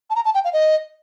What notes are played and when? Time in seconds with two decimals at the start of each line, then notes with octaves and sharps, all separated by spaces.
0.10 A5
0.16 A#5
0.25 A5
0.34 G5
0.44 F5
0.53 D#5